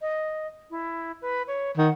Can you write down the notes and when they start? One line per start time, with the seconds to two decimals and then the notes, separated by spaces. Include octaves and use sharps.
0.01 D#5
0.70 E4
1.22 B4
1.48 C#5
1.77 D#3 F#5